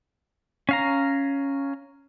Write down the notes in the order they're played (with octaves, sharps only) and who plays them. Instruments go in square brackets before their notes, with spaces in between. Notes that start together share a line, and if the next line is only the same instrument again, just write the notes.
[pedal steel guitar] C#4 F5 A#5